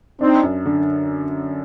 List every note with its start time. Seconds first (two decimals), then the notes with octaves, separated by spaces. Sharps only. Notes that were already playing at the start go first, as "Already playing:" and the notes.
0.20 C4 D4 D#4
0.43 F#2
0.66 D3